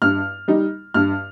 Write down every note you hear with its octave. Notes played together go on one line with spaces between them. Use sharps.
G2 F6
G3 D#4
G2 F6